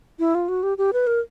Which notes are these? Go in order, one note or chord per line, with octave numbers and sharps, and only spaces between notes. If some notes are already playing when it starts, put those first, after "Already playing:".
E4
F4
F#4
G4
G4
B4
A#4